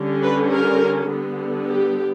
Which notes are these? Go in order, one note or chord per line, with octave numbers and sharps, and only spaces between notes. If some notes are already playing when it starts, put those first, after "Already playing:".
Already playing: D3 G3 C#4
B4
A#4
D3 G3 B3
G4